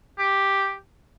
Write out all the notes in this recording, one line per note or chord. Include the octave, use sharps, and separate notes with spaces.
G4